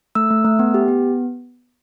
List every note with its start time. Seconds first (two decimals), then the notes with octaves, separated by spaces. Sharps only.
0.15 A3 E6
0.30 A3
0.45 A3
0.59 B3
0.74 G4
0.88 B3